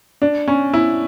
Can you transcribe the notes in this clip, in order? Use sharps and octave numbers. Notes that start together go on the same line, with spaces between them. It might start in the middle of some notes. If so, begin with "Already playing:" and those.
D4
C#4
E4